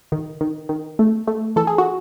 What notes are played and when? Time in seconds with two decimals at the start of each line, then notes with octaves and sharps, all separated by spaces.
0.12 D#3
0.41 D#3
0.69 D#3
0.99 A3
1.27 A3
1.56 E3 A4
1.67 G#4
1.78 F#4